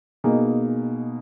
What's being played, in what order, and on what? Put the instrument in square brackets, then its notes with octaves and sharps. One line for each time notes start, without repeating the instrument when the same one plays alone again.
[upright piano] B2 A#3 D#4 G#4